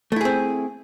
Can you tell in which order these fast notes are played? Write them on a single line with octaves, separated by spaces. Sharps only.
A3 E4 G#4 C4